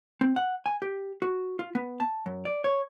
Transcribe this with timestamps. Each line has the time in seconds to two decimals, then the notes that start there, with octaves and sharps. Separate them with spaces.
0.21 C4
0.36 F#5
0.66 G#5
0.82 G4
1.22 F#4
1.59 F4
1.75 B3
2.00 A5
2.26 F#2
2.45 D5
2.64 C#5